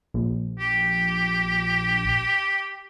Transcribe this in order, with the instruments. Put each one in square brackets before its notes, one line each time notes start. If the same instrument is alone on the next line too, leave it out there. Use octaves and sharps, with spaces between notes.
[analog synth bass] A#1
[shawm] G4